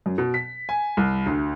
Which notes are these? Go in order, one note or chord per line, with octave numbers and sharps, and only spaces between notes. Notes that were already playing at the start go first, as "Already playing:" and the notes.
F#2
B2
B6
G#5
C2
D2